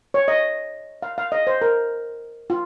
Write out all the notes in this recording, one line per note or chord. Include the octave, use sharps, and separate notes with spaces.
C#5
D#5
F5
F5
D#5
C5
A#4
F4